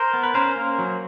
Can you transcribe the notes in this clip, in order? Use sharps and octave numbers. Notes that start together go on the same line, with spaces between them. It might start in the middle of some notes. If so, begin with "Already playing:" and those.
Already playing: A#4 C5
B3
B4
C#4 A#4 C5
A#3
F#3